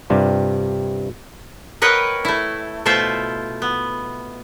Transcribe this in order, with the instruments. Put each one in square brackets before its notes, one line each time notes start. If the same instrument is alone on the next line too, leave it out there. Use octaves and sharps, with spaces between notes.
[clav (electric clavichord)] G2 C3 G3 D4 F4
[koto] A#4 B4 C#5 D#5 F#5 G5
A3 E4
B2 A3 E4 F4 C5 E5
B3